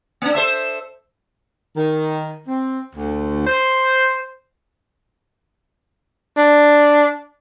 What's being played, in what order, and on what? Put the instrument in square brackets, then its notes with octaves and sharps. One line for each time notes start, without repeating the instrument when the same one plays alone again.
[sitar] A#3 D4
A4 C5 E5
[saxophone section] D#3
C4
D2
C5
[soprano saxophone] D4